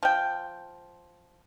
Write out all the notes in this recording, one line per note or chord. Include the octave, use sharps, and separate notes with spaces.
F3 G5